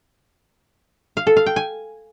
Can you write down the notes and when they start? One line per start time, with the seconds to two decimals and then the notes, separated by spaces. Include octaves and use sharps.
1.17 F5
1.27 A4
1.37 F5
1.46 G5
1.56 G#5